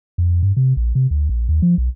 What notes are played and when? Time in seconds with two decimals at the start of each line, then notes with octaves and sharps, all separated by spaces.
0.18 F2
0.42 G2
0.57 C3
0.77 A#1
0.95 C3
1.11 D2
1.29 A#1
1.48 D#2
1.62 F3
1.78 B1